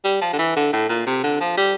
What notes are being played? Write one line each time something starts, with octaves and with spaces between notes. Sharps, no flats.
G3
F3
D3
E3
D3
A2
A#2
C3
D3
F3
G3